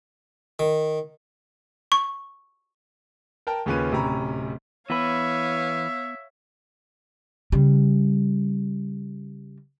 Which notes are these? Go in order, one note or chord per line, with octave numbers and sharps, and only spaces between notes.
D#3
C#6
A#4 G5 A5
D#2 C#3 C#4 F4 B4 D#7
D1 C3 C#4 A#5 B5
E3 B3 B4 C#5 E5 F5
C#3 G3